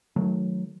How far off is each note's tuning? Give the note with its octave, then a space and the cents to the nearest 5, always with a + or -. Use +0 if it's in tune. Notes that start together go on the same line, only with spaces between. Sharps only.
D#3 +15 F#3 -10 A3 -15